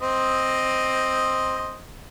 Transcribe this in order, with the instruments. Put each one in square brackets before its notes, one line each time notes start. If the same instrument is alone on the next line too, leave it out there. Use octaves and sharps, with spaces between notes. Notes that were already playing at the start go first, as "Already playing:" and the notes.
[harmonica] C4 C5 D#5